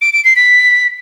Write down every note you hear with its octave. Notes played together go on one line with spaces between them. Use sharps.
D7
D7
C7
B6